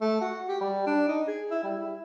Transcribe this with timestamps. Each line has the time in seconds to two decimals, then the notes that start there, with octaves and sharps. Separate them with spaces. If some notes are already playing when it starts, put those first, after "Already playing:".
0.01 A3
0.21 F#4
0.49 G4
0.61 G3
0.86 D4
1.08 D#4
1.27 G#4
1.51 E4
1.63 G3
1.80 E4